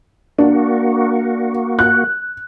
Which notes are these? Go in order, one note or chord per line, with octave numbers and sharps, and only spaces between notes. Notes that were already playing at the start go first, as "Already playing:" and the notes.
A#3 D4 F#4
F#6